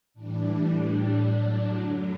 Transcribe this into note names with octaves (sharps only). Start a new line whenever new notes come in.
A2 E3 G3 D4
A2 G3 D4
A2 F#3 D4
F#2 D3 F#3